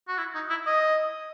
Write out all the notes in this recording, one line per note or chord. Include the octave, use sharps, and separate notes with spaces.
F#4
E4
D#4
E4
D#5